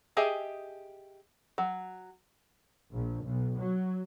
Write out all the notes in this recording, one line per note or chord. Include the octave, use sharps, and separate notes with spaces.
G4 G#4 D#5 E5 G#5
F#3
A#1
B1
F#3